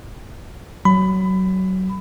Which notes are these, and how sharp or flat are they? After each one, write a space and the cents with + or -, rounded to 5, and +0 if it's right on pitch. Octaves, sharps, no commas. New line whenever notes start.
F#3 +20 B5 +20